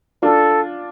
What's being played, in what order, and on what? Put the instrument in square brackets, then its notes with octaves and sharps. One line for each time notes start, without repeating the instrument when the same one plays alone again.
[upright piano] D4 F4 [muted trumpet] A4